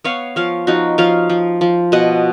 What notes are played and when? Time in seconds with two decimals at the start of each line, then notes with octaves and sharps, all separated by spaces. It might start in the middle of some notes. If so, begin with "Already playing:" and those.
0.04 B3 C#5 F5
0.36 F3 C#5 F5
0.67 F3 D#4 F#4
0.98 F3 C#5 F5
1.30 F3
1.61 F3
1.92 B2 D#5 F#5